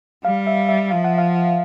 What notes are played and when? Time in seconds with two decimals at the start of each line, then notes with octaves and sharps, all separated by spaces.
0.24 G3 F5
0.47 E5
0.69 E5
0.90 F3 F5
1.04 F#5
1.18 F5